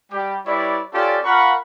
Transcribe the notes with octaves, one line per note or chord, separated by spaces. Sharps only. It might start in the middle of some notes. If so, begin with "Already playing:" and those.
G3 G4
G3 E4 B4 C#5 D5
C#4 F4 G4 A4 D5
F4 A#4 F5 F#5 B5 C#6